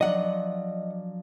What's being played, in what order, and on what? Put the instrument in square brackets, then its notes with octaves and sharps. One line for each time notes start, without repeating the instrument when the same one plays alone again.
[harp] F3 F#3 D4 [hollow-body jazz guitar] D#5 F#5